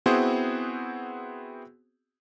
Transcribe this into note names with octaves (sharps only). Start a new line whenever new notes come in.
B3 C4 E4 F#4 G#4 C5